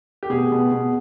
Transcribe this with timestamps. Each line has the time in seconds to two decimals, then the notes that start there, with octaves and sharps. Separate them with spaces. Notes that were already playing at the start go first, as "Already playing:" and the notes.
0.23 G4
0.30 B2 G#4
0.52 B2
0.72 B2